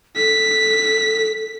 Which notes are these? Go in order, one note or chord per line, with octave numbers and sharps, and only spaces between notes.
A4 B6